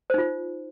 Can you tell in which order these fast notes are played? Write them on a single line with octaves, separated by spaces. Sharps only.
C5 D#4 F4